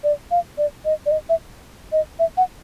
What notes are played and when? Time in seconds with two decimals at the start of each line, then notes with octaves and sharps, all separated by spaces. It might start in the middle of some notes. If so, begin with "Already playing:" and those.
0.04 D5
0.31 F5
0.58 D5
0.85 D#5
1.06 D5
1.11 D#5
1.29 E5
1.92 D#5
2.19 E5
2.37 F#5